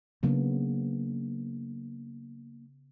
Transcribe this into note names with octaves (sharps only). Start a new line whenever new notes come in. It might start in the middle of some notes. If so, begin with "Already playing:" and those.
C#3 F#3 A#3 B3 D4